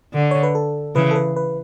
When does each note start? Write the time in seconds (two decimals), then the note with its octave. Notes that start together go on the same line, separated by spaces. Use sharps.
0.14 D3
0.31 C#5
0.43 B4
0.55 A4
0.95 C#3 E3 B4
1.11 A4
1.15 B4
1.36 B4